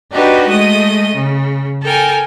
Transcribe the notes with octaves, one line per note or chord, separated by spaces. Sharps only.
D4 D#4 F#4 G4 B4
G#3 A3 D#5 D#6
C#3
A4 A#4 G5 G#5